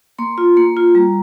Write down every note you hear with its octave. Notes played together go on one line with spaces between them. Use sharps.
A#3 C6
F4
A#3
F4
G3 A#5